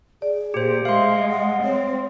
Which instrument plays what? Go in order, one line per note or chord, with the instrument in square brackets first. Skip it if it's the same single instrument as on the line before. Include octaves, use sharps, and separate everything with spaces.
[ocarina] G#4 [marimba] D5
[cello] A#2 [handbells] G4 C5
[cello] G#3 [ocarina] E5 [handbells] F5 C6
[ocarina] F#5
[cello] C4 [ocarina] C#5